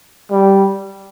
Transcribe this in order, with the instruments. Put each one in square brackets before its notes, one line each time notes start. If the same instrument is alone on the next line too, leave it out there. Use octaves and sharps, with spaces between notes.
[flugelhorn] G3